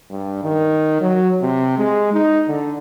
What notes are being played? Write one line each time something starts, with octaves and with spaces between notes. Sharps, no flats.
G2
D#3
F#3
C3
G#3
D#4
D3